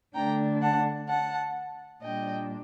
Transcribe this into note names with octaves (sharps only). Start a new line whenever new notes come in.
D3 A3 D4 G5 A#5
F#5 A5
F#5 A5
A#2 G3 D4 D#5 G5